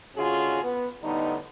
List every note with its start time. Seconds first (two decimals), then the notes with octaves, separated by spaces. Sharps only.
0.17 G#2 D3 C#4 F4 F#4 G#4
0.63 B3
1.03 A2 D3 G3 B3 D#4